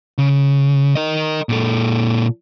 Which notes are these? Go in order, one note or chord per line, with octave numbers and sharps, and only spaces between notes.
C#3
A#4 D#5
A#2 A4